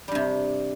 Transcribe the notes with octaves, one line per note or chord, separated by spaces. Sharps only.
G2 C3 G3